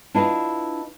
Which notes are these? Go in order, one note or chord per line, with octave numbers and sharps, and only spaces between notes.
D4 E4 F4 B4 D#5 F5